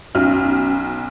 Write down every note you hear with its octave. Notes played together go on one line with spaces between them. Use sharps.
B1 C#4 F6